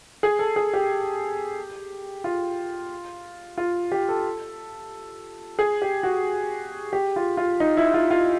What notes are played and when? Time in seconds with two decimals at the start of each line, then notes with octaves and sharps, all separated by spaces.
0.23 G#4
0.39 A4
0.56 G#4
0.74 G4
2.24 F4
3.58 F4
3.92 G4
4.09 A4
5.59 G#4
5.82 G4
6.03 F#4
6.93 G4
7.16 F4
7.37 F4
7.60 D#4
7.77 E4
7.94 F4
8.11 F4